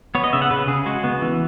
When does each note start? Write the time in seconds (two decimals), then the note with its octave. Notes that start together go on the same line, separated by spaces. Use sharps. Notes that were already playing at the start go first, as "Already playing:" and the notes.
0.15 B3 C#5
0.24 D#5
0.33 C#3 E5
0.42 F#5
0.51 C#3 B4
0.68 C#3 G#4
0.86 G#3 F#4
1.04 B3
1.22 E3